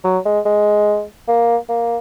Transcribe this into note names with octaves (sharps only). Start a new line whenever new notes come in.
F#3
G#3
G#3
A#3
A#3